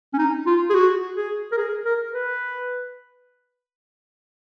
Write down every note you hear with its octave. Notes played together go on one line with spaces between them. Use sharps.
C#4
D#4
F4
G#4
F#4
G#4
A#4
G#4
A#4
B4